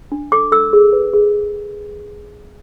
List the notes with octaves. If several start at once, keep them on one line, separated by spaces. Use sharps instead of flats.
D4
A4 D6
A4 E6
G#4
B4
G#4